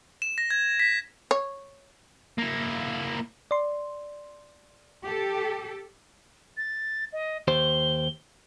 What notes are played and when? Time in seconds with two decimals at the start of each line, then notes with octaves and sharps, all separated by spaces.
0.22 E7
0.38 A#6
0.51 G#6
0.80 B6
1.31 C#5
2.38 A#3 E4
3.51 D5 C6
5.04 G4 A4
6.57 A6
7.13 D#5
7.48 D#2 G4 C5 G7